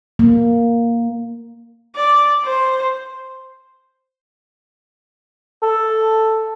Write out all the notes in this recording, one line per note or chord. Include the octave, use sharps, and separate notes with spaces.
A#3
D5
C5
A4